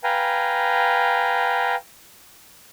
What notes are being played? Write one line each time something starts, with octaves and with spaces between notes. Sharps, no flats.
B4 F5 G5 G#5 A#5